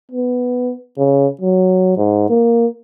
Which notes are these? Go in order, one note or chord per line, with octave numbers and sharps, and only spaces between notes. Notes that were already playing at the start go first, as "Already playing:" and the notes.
B3
C#3
F#3
G#2
A#3